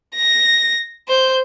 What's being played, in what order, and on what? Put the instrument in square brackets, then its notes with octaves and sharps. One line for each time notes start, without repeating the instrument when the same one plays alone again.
[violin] A#6
C5 G6